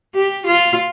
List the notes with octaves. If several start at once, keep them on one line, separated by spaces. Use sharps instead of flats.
G4
F4